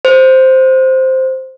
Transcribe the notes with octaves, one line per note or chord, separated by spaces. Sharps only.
C5